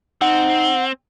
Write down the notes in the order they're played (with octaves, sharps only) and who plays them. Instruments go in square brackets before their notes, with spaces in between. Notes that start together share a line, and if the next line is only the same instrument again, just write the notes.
[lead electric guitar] C4 [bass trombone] D#4 [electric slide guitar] F#5